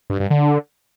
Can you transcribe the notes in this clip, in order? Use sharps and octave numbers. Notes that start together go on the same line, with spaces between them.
G2
G2
D3